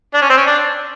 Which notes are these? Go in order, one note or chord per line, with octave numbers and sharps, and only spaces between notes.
D4
C#4
C4
C#4
D4